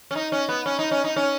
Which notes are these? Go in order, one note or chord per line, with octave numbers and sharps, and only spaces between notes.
C#4
D#4
C#4
B3
C#4
D#4
C#4
D#4
C#4